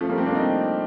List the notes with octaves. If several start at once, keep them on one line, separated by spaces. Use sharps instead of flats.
F3 A3
G3 A#3
A3 C4
A#3 D4
C4 D#4